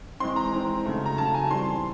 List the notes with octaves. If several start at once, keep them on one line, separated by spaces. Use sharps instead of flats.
E3 G#3 C4 C6
A#5
E3 G#3 C4
C#3 F#3 A3
A#5
C#3 F#3 A3 A5
G#5
E3 G3 C4 C6